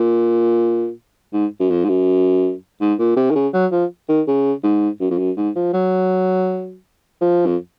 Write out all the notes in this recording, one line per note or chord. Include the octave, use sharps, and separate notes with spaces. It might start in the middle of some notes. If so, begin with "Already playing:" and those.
Already playing: A#2
G#2
F#2
F2
G#2
F#2
G#2
A#2
C3
D#3
C#3
F#3
F3
D#3
C#3
G#2
F#2
F2
F#2
G#2
F3
F#3
F3
F2